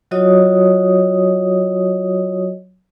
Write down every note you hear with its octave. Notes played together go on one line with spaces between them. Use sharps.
F#3 F4 F#4 C#5 D#5 D#6